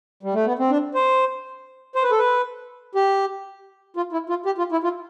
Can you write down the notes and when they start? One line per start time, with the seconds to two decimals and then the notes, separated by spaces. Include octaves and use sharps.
0.23 G3
0.34 A3
0.45 B3
0.59 C4
0.70 D4
0.94 C5
1.95 C5
2.03 B4
2.11 A4
2.19 B4
2.95 G4
3.97 F4
4.12 E4
4.29 F4
4.46 G4
4.58 F4
4.72 E4
4.84 F4